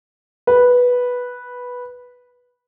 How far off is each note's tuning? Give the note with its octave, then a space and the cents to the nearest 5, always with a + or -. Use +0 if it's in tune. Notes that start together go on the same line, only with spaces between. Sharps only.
B4 -5